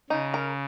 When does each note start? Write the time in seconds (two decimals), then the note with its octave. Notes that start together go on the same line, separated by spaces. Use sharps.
0.10 C#3 D#4
0.34 A#4